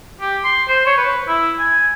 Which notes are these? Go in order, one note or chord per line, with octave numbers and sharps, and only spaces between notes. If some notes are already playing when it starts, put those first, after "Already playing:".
G4
C6
C5
C#5
B4
E4
G#5